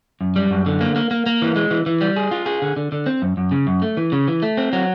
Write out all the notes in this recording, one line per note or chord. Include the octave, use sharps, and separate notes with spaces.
F#2
G3
F#2
D3
A#3
A#3
A#3
A#3
E3
G#3
E3
E3
G3
G#4
F4
G#4
D3
D3
D3
C4
F#2
F#2
C#3
F#2
A3
E3
C#3
E3
A3
C4
F#3